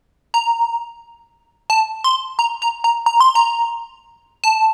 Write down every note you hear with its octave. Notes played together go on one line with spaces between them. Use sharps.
A#5
A5
C6
A#5
A#5
A#5
A#5
C6
A#5
A5